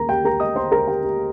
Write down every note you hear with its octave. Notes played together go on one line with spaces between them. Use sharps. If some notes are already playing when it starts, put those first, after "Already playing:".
Already playing: D#2 A#4 A#5
G4 G5
A#4 A#5
D#5 D#6
C5 C6
A#4 A#5
G4 G5
G4